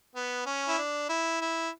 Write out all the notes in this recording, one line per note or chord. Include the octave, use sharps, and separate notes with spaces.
B3
C#4
E4
D4
E4
E4